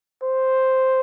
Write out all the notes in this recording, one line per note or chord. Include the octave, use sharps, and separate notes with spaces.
C5